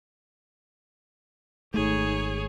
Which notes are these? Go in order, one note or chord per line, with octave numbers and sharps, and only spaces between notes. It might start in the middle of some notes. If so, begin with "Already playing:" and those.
G#1 A3 D#4 G#4 C#5